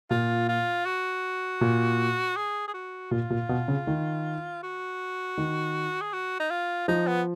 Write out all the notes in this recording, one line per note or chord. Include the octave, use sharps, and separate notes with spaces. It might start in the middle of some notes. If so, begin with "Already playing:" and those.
A#2 F4
F4
F#4
A#2
G#4
G#4
F#4
A#2 F4
A#2
B2
C#3
D#3
F#4
D#3
G#4
F#4
D#4
F4
F3 D#4
B3